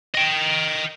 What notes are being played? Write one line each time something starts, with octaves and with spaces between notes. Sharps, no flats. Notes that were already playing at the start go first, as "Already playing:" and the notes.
D#5 G5